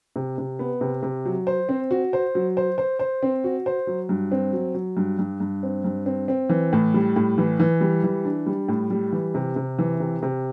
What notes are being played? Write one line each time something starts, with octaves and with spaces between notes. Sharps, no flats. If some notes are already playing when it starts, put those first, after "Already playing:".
C3
C3
B3
C3
C3
F#3
C5
C4
F#4
C5
F#3
C5
C5
C5
C4
F#4
C5
F#3
G2
C4
F#3
F#3
G2
G2
G2
C4
G2
C4
C4
E3
A2
G3
A2
E3
E3
G3
E3
D4
G3
A2
G3
E3
C3
C3
E3
C3
C3